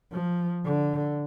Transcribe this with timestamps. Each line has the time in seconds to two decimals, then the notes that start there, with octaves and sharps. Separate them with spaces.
0.12 F3
0.65 D3